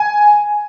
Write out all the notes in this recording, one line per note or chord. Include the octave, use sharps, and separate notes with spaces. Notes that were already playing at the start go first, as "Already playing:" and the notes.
Already playing: G#5